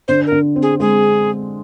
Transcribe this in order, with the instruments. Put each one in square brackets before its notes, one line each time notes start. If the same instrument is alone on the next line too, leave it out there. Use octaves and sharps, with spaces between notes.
[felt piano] D3 [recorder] C5
[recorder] A#4
[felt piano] D3
C4
[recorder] G#4
[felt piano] G#3 [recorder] G#4